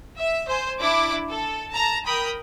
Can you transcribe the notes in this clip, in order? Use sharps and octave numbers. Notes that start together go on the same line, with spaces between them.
E5
C5 G#5
D4 E4 D6
A4
A5 A#5
A#4 G5 B5 D#6